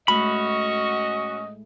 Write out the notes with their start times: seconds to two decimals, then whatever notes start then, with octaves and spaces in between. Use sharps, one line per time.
0.08 A2 G#3 A3 C#4 F#4 D#5 B5